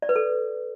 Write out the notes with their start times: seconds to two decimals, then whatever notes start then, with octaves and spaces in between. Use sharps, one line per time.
0.02 D5
0.09 B4
0.16 A4